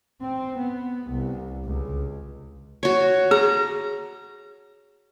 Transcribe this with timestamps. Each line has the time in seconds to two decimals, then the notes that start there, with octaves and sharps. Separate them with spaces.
0.20 C4
0.56 B3
1.08 C2
1.64 C#2
2.83 F#4 C#5
3.31 G#4 A#5